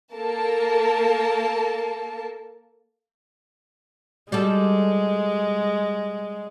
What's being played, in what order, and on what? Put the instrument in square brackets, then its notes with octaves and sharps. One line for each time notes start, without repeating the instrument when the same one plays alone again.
[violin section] A#3 A4 A#4 A5
[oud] G3 F#4 A4 [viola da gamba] G#3